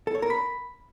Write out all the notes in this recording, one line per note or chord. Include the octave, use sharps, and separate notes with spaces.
A4
C#5
A#4
B5